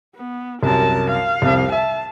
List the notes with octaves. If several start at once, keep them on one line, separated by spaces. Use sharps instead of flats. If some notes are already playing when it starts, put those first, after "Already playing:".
B3
C2 F#2 A#4 A5
F5
C2 F2
E5 A5